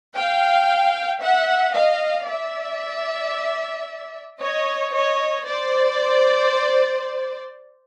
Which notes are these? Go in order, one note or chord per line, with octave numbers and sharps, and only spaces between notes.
F5 G5
E5 F#5
D#5 F5
D5 E5
C#5 D#5
C#5 D#5
C5 D5